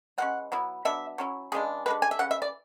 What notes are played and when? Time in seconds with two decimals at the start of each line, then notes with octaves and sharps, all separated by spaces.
0.18 E3 G#3 C#4 F#5
0.52 F#3 B3 E4
0.85 F#3 B3 D4 E5
1.18 F#3 C#4 E4
1.52 C#3 E3 G#3 D4 G#4
1.86 D3 G#3 D4 B4
2.02 G#5
2.11 E5
2.19 C#3 E3 F#5
2.31 E5
2.42 D5